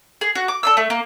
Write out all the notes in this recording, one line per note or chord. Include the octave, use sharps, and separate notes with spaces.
G#4
F#4
D6
A4 D5 E6
A3
A#3